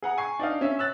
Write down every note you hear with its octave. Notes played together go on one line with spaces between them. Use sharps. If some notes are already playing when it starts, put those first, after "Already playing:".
G#4 F#5 A#5
G#5 C#6 C7
D4 D#4 F5
C#4 E5
E6 F#6 A6